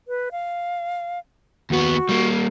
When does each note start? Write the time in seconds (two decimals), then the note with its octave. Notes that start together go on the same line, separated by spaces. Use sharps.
0.08 B4
0.32 F5
1.70 D#2 B3 F#4
2.09 G3 A#3